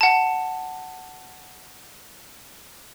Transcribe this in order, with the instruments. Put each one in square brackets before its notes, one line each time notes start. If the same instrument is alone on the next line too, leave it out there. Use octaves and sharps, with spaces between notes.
[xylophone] F#5 A5